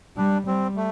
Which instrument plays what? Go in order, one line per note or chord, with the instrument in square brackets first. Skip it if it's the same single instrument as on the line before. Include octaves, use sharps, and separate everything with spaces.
[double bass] G3 [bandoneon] D4
[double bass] G3 [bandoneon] C4
[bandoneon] A3